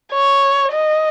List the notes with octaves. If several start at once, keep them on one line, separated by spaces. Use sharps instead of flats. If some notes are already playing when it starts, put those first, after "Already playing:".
C#5
D#5